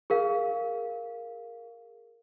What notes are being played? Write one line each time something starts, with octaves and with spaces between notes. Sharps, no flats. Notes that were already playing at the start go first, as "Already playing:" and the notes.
G#4 A#4 F5